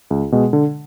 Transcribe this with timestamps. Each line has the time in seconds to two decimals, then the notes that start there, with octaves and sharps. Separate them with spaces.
0.10 C#2
0.32 B2 G#3
0.53 D3